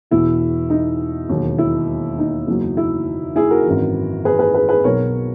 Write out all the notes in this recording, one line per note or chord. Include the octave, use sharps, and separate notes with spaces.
E1 E2 B2 E4
D#4
E1 D#2 D#3 F#3
E4
D#4
F#1 E2 D#3 F#3
E4
E4 G#4
F#4 A#4
G#1 F#2 E3
G#4 B4
G#4 B4
G#4 B4
G#4 B4
B1 B2 F#3 A#4 C#5